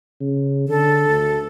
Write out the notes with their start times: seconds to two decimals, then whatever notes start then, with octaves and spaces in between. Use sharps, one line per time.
0.21 C#3
0.69 D3 A4
1.09 D2